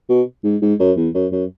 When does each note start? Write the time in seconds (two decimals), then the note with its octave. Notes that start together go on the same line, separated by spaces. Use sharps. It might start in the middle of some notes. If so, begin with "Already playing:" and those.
0.09 B2
0.44 G#2
0.62 G#2
0.80 F#2
0.97 E2
1.14 F#2
1.32 F#2